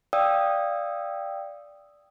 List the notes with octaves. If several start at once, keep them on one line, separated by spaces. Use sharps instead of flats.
D5 F5 G5 D#6 E6